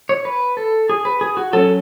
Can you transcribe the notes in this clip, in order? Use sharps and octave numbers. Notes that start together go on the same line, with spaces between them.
C#5
B4
A4
G#4
B4
G#4
F#4
F#3 C#4 A4